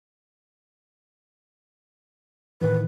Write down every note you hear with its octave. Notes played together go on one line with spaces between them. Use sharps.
A2 D#3 E3 B4